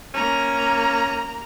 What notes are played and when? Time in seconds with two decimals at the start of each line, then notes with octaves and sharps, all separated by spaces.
0.14 A#3 C#4 A#5